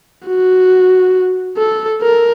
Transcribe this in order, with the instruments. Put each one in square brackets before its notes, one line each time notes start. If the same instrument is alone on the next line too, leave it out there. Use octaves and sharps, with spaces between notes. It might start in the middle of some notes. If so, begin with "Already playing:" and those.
[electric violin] F#4
A4
A#4